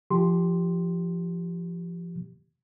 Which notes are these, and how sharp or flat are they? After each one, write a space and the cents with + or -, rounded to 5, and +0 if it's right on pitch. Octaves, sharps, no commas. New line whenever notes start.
F3 -20 G4 -5 C6 +0